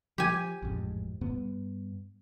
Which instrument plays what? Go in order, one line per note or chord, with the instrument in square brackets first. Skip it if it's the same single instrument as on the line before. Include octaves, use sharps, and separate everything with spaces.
[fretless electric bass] F3 [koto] G4 G#5
[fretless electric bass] A1 F2 G#2
G2 B3